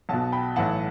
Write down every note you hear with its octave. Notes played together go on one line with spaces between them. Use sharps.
B1 B2 F#5 A5
G5 B5
B1 A2 E3 F#5 A5